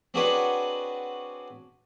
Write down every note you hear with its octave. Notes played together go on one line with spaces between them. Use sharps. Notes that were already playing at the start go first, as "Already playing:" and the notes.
C4 D4 F#4 G#4 B4 C#5